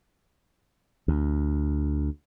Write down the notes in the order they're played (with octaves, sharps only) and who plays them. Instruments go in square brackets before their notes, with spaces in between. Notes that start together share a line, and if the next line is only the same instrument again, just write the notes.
[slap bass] D2